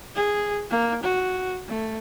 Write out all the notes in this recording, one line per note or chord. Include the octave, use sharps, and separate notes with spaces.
G#4
A#3
F#4
A3